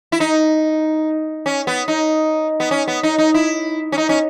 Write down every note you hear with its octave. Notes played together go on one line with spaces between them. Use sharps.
E4
D#4
C#4
B3
D#4
B3
C#4
B3
D#4
D#4
E4
C#4
D#4
C#4